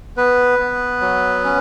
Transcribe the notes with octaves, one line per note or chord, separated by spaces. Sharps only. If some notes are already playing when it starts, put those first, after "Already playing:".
B3 B4
B3
F#3
C#4